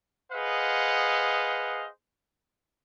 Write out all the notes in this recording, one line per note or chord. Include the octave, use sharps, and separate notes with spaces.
G#4 B4 C5 D#5 F5 F#5